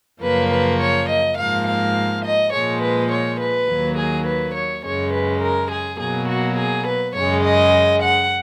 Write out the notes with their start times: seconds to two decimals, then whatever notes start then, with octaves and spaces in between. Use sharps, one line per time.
0.22 F#2 C#3 F3 A#3 B4
0.51 B4
0.81 C#5
1.09 D#5
1.38 G#2 F3 A#3 F5
1.67 F5
2.25 D#5
2.53 A#2 F3 G#3 C#5
2.82 B4
3.11 C#5
3.40 B4
3.69 D#2 D#3 F#3 A#3
3.98 G#4
4.27 B4
4.55 C#5
4.84 F#2 C#3 G#3 C#5
5.13 B4
5.42 A#4
5.71 G#4
6.00 B2 F#3 A#3 G#4
6.29 F#4
6.58 G#4
6.87 B4
7.15 F#2 C#3 G#3 C#5
7.44 D#5
8.02 F#5